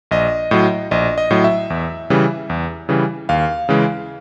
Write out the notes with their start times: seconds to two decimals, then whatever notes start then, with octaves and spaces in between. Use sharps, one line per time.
0.11 A#1 D#5
0.51 A2 F#3
0.91 A#1 D#5
1.18 D#5
1.30 A2 F#3
1.44 E5
1.70 E2
2.10 C#3 E3 G3
2.50 E2
2.89 C#3 E3 G3
3.29 D#2 F5
3.69 C#3 E3 G#3